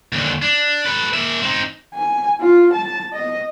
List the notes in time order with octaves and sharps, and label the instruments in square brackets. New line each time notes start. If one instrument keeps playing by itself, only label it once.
[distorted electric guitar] D#2 D3
D4
A4 B4
A#3 E5
C4 D#4
[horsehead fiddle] G#5
F4
A5
D#5